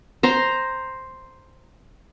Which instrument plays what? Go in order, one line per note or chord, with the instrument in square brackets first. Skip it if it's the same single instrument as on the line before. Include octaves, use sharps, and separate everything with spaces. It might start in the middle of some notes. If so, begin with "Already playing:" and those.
[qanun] C5 A#5 C6